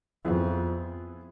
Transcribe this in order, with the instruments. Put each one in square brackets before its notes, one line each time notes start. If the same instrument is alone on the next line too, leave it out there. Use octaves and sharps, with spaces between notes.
[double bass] F2 [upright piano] F3 B3 E4 G#4